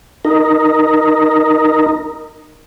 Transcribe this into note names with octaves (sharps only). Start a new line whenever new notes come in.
D#4 A#4